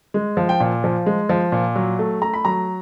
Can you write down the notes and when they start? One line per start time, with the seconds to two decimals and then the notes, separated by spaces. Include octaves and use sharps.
0.14 G#3
0.37 F3
0.49 G5
0.60 A#2
0.84 F3
1.06 G#3
1.29 F3
1.52 A#2
1.76 F#3
1.99 A3
2.22 A3 A#5
2.34 B5
2.45 F#3 A#5